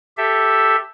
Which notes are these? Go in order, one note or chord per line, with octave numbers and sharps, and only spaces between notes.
G4 A4 E5